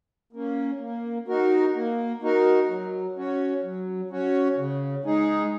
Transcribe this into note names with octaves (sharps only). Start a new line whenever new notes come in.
A#3 C#4
A#3
D#4 F#4 A#4
A#3
D#4 F#4 A#4
F#3
C#4 F#4 C#5
F#3
C#4 F#4 C#5
C#3
G#3 D#4 G#4